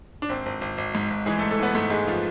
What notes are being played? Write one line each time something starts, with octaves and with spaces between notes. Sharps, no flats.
D4
G#1 C4
G#1
G#1
G#1
G#2
G#1
E3 G#3 G#4
A3 A4
G#2
A3 A4
E3 B3 B4
G#2 A3 A4
G#2 G#3 G#4
F3 F4